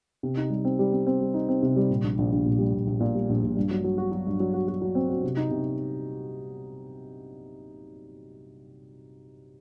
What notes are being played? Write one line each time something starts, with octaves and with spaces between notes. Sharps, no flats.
C3
D#4
G3
C4
G3
C4
C4
G3
D#4
C4
C3
G3
A#2
A#1
A#1
A#1
A#2
G3
A#1
A#1
A#2
G3
A#1
A#1
G2
F#3
F#3
F#4
F#3
G2
F#3
F#4
F#4
F#3
C4
F#4
C3
D#4
C3